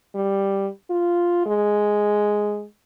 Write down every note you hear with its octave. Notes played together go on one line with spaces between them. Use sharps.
G3
F4
G#3